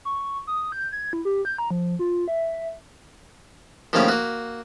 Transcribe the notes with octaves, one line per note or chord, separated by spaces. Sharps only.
C#6
D#6
G6
G#6
E4
G4
G6
A#5
F3
F4
E5
A#1 A2 C3 D#3 C#4 F5
A#3 F#4